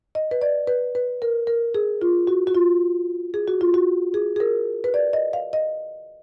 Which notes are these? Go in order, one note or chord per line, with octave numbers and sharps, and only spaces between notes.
D#5
B4
D5
B4
B4
A#4
A#4
G#4
F4
F#4
F#4
F4
G#4
F#4
F4
F#4
G#4
G#4
A#4
B4
D5
D#5
F5
D#5